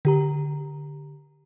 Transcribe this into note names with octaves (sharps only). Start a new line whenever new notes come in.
D3 G4 A#5